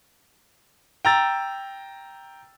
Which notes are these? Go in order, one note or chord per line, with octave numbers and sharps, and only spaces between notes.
G5 A#5 E6 A6